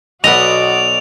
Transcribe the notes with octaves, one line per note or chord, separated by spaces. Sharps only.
B1 B3 F#4 D5 D#5 F7